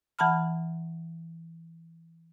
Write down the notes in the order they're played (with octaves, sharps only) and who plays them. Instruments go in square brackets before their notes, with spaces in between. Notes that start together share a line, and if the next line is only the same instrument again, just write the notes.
[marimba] E3 F#5 A5 B5 F6